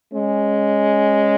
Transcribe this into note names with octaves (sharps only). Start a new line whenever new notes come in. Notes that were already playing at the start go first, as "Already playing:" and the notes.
G#3 C#4